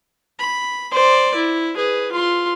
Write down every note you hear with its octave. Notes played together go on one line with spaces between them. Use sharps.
B5
C5 D5
E4
G#4 B4
F4 C6